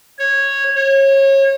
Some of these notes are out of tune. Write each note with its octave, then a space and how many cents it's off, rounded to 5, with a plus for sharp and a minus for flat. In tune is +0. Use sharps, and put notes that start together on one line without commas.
C#5 -10
C#5 -30